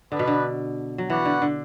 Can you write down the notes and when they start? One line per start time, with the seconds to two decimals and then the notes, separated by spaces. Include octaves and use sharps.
0.12 D3 B3 D4 B4
0.19 B2
0.27 D3
0.98 F#3
1.09 E3 F#4 B4 D5 F#5
1.25 D3
1.42 D3